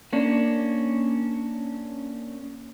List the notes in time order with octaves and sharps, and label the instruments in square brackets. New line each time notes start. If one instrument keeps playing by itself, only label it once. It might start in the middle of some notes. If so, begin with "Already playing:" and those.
[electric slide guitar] A#3 C#4 D4